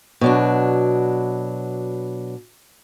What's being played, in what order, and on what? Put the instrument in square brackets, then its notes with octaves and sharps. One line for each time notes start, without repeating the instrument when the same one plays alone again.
[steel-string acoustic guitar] B2 F#3 D4